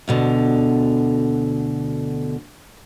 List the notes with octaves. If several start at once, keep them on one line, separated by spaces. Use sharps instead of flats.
D2 B2 D3